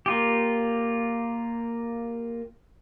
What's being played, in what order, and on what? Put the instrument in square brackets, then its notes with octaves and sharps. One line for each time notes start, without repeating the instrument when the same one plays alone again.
[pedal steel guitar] A#3 F4 G4